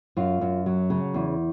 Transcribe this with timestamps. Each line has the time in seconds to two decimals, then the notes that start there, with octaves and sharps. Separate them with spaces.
0.17 F#2 F4
0.41 F#2
0.66 F#3
0.90 C#3
1.14 E2